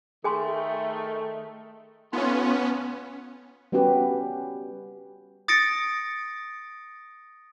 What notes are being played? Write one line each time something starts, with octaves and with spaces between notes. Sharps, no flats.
D#3 A3 G#4 G#5 C6
A2 B3 C#4 D#4 F4
G3 B3 C#4 F#4 G4 B4
D#6 A6 A#6 C#7 D7